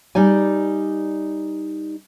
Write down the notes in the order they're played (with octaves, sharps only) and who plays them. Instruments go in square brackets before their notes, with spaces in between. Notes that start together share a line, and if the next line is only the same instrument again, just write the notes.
[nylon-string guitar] G3 D#4 D5 G#5